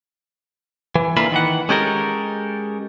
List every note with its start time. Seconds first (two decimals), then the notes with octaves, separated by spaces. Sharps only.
0.95 E3
1.17 D3 E3 A#3 F4 E5 B5
1.32 D#3 E3 F#5
1.69 G#3 C#4 G4 A4 A#4